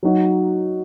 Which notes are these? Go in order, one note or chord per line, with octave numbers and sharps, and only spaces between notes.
F#3 D#4 F#4